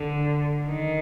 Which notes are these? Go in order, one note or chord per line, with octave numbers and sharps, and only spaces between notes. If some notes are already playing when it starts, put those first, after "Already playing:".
Already playing: D3
D#3